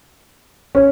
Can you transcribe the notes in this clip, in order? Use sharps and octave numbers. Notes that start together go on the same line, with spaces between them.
C#4